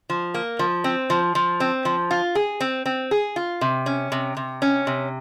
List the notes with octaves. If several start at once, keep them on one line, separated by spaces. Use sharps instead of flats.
F3
A#3
F3
C4
F3
F3
C4
F3
F4
G#4
C4
C4
G#4
F4
C3
C#4
C3
C3
C#4
C3